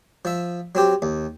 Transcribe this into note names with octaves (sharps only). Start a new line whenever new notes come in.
F3 E5
F#3 C4 G4
D#2